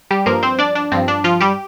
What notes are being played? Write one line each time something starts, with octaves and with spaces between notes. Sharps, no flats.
G3 G4
G2 F3 A#3 A#4
C4 C5
D4 D5
D4
G2 F3 C4
D4
F3 F4
G3 G4